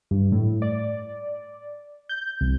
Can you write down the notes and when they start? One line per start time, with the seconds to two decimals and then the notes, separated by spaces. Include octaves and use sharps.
0.11 G2
0.32 A2
0.62 D5
2.09 G6
2.41 C2